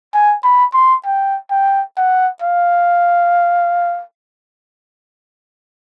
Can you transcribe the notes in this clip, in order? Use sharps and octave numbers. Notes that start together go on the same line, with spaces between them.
G#5
B5
C6
G5
G5
F#5
F5